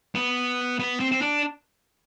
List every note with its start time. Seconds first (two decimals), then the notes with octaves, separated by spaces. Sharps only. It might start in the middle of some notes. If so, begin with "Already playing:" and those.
0.15 B3
0.80 B3
1.00 C4
1.12 C4
1.22 D4